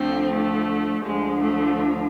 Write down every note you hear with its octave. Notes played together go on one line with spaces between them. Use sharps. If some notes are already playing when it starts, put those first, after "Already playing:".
Already playing: D2 D3 F3 A3 C4
A3
D2 D3 F3 G#3
A3